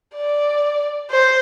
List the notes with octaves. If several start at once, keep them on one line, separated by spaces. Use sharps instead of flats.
D5
C5